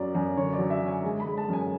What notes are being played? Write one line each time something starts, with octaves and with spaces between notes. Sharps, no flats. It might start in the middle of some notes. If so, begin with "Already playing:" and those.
Already playing: F#2 F#3 D5
F#2
D3 C#5
D5
F#3
E5
D3
G#5
G#3
B5
G#3
A5
F#2 G#5